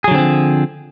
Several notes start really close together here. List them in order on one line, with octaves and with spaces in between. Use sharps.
G#4 F#3 D3 C4 F3